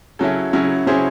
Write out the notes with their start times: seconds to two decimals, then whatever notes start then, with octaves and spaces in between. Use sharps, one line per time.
0.19 C#3 F#3 C#4 E4 A4
0.53 C#3 F#3 C#4 E4
0.87 C#3 F#3 C#4 E4 G#4 C5